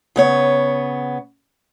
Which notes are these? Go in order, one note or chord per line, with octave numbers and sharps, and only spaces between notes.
C#3 B3 C#5